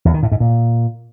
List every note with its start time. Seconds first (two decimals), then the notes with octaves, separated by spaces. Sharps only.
0.05 E2
0.14 D#3
0.23 A2
0.32 G#2
0.40 A#2